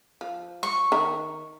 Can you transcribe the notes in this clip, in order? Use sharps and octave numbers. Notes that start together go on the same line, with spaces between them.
F3
C#6
D#3 E5 A#5